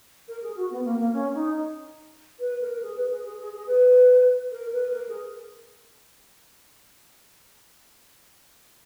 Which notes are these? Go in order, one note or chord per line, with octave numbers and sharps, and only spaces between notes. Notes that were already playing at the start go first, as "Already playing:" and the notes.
A#4
G#4
F#4
B3
A#3
A#3
C#4
D#4
B4
A#4
G#4
B4
G#4
G#4
G#4
G#4
B4
A#4
B4
A#4
G#4